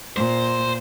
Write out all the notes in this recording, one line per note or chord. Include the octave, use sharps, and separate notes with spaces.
A#2 C5